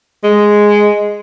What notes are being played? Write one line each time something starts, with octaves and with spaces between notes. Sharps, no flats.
G#3